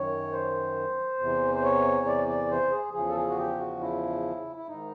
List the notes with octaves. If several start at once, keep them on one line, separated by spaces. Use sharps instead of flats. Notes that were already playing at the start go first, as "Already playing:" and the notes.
Already playing: F#2 D#3 C#5
C5
E2 C3 E3
C5
C#5
D5
D5
C5
G#4
E2 C#3 F3 G#4
A4
G#4
F#4
G4
F#4
E4
E4
G#2 D#3 D#4